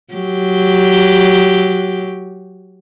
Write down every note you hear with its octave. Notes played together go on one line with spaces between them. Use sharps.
F#3 G4